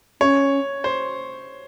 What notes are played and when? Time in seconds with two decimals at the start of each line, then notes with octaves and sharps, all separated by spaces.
0.21 C#4 C#5
0.84 C5